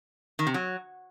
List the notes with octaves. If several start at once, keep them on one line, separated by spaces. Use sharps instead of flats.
D#3
C3
F#3